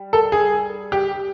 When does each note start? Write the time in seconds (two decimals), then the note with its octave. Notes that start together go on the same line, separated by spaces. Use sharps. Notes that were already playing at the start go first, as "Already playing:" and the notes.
Already playing: G3
0.13 A4
0.32 G#4
0.92 G4